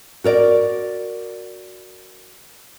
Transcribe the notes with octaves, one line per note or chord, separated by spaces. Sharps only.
F#4 A#4 D5